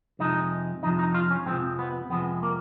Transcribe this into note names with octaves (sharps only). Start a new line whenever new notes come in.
F2 C3 F3 G#3 D#4
F2 C3 F3 G#3 D#4
D#4
F4
C#4
F2 C3 F3 G#3 C4
B3
F2 C3 F3 G#3 B3
A#3